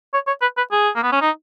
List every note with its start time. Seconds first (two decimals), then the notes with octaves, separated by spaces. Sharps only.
0.14 C#5
0.27 C#5
0.42 B4
0.57 B4
0.72 G#4
0.95 A#3
1.03 B3
1.12 C#4
1.21 D#4